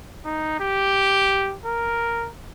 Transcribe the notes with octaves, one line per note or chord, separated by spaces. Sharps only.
D#4
G4
A#4